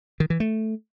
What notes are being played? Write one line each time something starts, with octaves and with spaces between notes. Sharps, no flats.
D#3
E3
A3